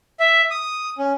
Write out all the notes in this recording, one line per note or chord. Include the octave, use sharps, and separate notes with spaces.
E5
D#6
C#4